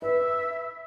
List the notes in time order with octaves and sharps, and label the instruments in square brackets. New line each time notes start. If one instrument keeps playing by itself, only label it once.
[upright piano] B4 [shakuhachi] E5